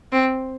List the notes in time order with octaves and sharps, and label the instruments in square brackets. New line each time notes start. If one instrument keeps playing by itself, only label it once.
[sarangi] C4